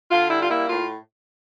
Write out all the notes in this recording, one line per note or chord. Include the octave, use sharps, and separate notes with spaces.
D3 F4
G3 E4
F4
A#3 E4
A2 F4